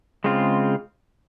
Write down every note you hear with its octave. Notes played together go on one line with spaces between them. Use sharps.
C#3 G#3 C4 F4